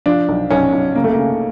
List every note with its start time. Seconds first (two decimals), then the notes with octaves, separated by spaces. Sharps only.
0.06 F3 D4
0.29 B1
0.50 B1 C#4
0.73 B1
0.95 C#3 A#3
1.04 A3
1.12 A#3
1.18 C#3